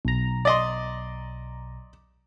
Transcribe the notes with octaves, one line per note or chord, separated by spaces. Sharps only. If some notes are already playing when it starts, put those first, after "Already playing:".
B1 A#5
D5 D#5 C6